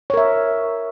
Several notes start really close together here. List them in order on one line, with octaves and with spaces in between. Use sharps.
C#5 A#4 E5